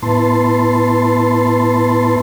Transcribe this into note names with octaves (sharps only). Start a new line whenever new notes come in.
A2 B3 E4 B4 A5 C6